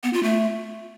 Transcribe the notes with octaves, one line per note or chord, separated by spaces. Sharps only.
B3
F4
A3